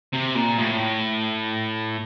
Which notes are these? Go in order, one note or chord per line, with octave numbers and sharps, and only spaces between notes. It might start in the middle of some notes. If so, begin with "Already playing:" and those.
C3
A#2
A2